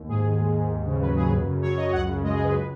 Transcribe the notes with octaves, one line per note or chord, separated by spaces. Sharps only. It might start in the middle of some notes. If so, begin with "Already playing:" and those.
Already playing: D#2
G#2 G#4
D#3
G#3
G#2
D#2
C#3
F#3 B4
D#2 G#4
F#2 B4
C#3
F#3 C#5
F#2 D#5
C#2 F#5
C#3
G#3 D#5
G#4
C#2 B4